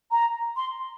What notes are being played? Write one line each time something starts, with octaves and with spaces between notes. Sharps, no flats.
A#5
C6